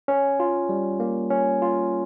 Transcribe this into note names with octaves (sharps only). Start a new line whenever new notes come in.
C#4
F4
G3
A#3
C#4
F4